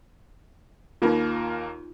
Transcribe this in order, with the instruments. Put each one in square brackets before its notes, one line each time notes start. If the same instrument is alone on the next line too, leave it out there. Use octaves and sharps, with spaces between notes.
[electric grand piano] D#2 A#3 A#4 [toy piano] D#4 F4